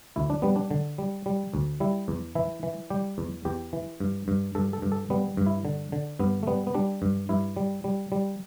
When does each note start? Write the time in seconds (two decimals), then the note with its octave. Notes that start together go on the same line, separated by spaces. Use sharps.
0.16 D2 E4
0.30 D4
0.42 G3 B3
0.56 D4
0.71 D3
0.98 G3
1.26 G3
1.53 D2
1.80 G3 E4
2.08 E2
2.35 E3 E4
2.63 E3
2.90 G3 G4
3.18 E2
3.45 E2 G4
3.73 E3
4.00 G2
4.28 G2
4.55 G2 A4
4.73 A4
4.82 G2
4.92 A4
5.10 G3 B3
5.37 G2
5.46 E4
5.65 D3
5.92 D3
6.19 G2 B3
6.43 A3
6.47 G3 B3
6.67 B3
6.74 G3 D4
7.02 G2
7.29 G2 E4
7.56 G3
7.84 G3
8.12 G3